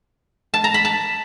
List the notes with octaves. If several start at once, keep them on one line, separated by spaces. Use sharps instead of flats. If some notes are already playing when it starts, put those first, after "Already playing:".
A5
A#5
B5
A5